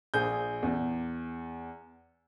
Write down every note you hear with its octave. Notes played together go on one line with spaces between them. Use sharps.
A#1 G#4 G6
E2